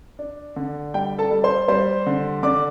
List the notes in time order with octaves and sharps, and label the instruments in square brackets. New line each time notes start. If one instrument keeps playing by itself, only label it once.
[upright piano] D4
D3
G3 G5
A4 A5
G3
C5 C6
G3 C5 C6
D3
D3 D5 D6